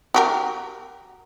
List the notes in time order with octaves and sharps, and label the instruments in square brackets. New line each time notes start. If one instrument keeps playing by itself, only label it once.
[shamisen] F#4 G4 A#4